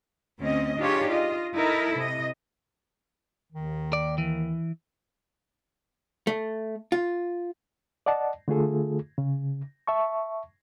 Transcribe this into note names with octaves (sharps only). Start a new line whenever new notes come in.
D2 C4 C#4 D#5
D4 D#4 F4 G4 G#4 C#5
F4 D#5
D#4 E4 A4 A#4
C3 D#5
D#2 D#3
D5
E3
A3
F4
D5 D#5 F#5 A5
D3 A3 F4 G#4 A4
C#3
E5 A5 C#6